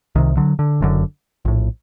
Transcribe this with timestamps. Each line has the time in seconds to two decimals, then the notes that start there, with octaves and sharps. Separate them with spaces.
0.15 C2 C3 D#3
0.37 D3 F#3
0.59 D3
0.81 F#1 F#2 D3
1.45 A#1 A2